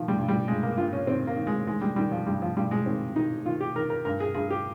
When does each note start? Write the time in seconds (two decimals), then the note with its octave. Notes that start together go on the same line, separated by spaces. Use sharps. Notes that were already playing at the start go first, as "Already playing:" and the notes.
Already playing: D#3 F3
0.08 G3
0.18 G2
0.28 G3
0.48 G2 G#3
0.63 A#3
0.77 G2 F4
0.93 C#4
1.07 D#3 C4
1.27 A#3
1.36 D#3
1.47 G#3
1.67 D#3 G#3
1.81 G3
1.96 D#3 G3
2.11 F3
2.27 G2 G3
2.42 F3
2.56 G2 G3
2.71 G#3
2.86 D#3 C4
3.16 D#3 D#4
3.45 D#3 F4
3.61 G4
3.76 D#3 A#4
3.90 A#4
4.05 G2 A#4
4.20 G#4
4.34 G2 G#4
4.50 G4